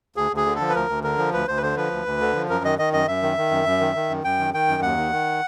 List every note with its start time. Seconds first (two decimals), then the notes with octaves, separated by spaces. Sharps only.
0.16 D2 G#4
0.31 D2 G#4
0.46 D3
0.55 A4
0.60 F3
0.69 B4
0.75 D2 A#4
0.89 D2
1.04 D3 A#4
1.18 F3
1.33 D2 B4
1.48 D2 C5
1.57 B4
1.62 D3 C5
1.77 F3 B4
1.91 D2
2.06 D2
2.20 D3
2.35 F3
2.49 F#2 A#4
2.64 D#3 D#5
2.79 D#3 D#5
2.93 F#2 D#5
3.08 F#2 E5
3.22 D#3
3.37 D#3
3.51 F#2
3.66 F#2
3.81 D#3
3.95 D#3
4.10 F#2
4.24 F#2 G5
4.39 D#3
4.54 D#3 G5
4.68 F#2
4.82 D#2 F#5
4.97 D#3
5.12 D#3